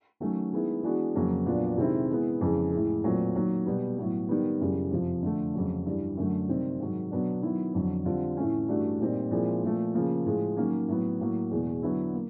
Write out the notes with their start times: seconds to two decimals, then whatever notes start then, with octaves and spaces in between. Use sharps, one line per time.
0.20 D#3 F#3 A3 C#4
0.53 D#3 G#3 B3 E4
0.83 E3 G#3 B3 D4 F#4
1.15 F2 C#3 F#3 A#3
1.46 A#2 F#3 B3 D4 F4
1.77 C3 D#3 G#3 C4 E4
2.10 E3 G#3 B3 E4
2.41 F2 C#3 E3 G#3
2.71 A2 E3 G#3
3.04 A#2 F#3 A3 C4 F4
3.34 D#3 F#3 A#3
3.66 B2 G3 B3
3.98 A2 F#3 B3
4.29 D#3 G3 B3
4.61 F#2 C#3 E3 G3
4.91 F2 C3 F3
5.23 D3 F3 A3
5.54 F2 C#3 F#3
5.86 G2 E3 G3
6.17 F#2 D3 F#3 A3
6.49 C3 D#3 G3 C4 D#4
6.80 G#2 D#3 F#3
7.11 B2 F#3 B3 D4
7.42 D#3 F#3 B3 E4
7.74 F2 D3 F#3
8.05 D3 G3 C4 F4
8.37 A2 E3 A3 C#4
8.68 G2 E3 A3 D4 F#4
9.00 A#2 G3 C4 D#4
9.31 A#2 F3 G#3 C4 E4
9.63 A#2 F3 A3
9.94 C#3 F3 A#3
10.25 A2 F3 G#3
10.57 D#3 F#3 A#3 C#4
10.88 A2 F#3 B3
11.20 A2 F#3 A#3
11.51 E2 B2 G#3
11.82 D3 F#3 B3 E4
12.14 A#3